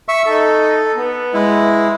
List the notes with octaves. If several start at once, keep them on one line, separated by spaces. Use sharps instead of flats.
E5 C#6 E6
D#4 A4
B3
G#3 E4